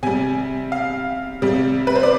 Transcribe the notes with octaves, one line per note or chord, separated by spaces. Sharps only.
C3 G3 G#5
F5
C3 G3
B4
C5
D5